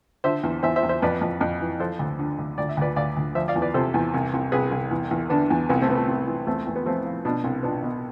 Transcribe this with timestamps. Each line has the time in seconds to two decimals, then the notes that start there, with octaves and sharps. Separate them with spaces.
0.24 D3 C5 E5
0.43 E2
0.63 E2 C5 E5
0.76 C5 E5
0.83 E2
0.89 C5 E5
1.02 F2 B4 D5
1.21 F2
1.41 F2
1.61 E3
1.80 F3 A4 C5
1.99 D2
2.19 D3
2.38 D2
2.58 D2 D5
2.69 E5
2.77 D2 B4 D5
2.96 D2 D5 F5
3.17 D2
3.35 F3 C5 E5
3.48 D5 F5
3.55 E2
3.62 B4 D5
3.74 C3 A4 C5
3.94 E2
4.14 C2
4.34 C2
4.52 C2 G#4 B4
4.71 C2
4.91 E2
5.11 E2
5.30 D3 B3 D4
5.50 E2
5.69 C2 B3
5.82 A3 C4
5.88 C2 B3
5.95 A3
6.08 C2
6.27 E3
6.47 E2 A3 C4
6.67 E2
6.76 B3
6.86 F3 A3 C4
7.06 F3
7.25 B2 B3 D4
7.44 C2
7.63 B2 B3 D4
7.83 B2